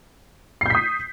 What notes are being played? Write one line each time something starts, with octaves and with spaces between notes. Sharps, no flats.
D#6 G6 B6 C7